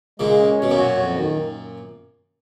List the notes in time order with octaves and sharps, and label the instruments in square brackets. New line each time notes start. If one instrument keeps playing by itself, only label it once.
[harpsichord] A#2 C#3 [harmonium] G#3
[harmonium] C#4
[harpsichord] B2 [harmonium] C#5
[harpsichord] F#2 A#2
[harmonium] F#4
F2
D#3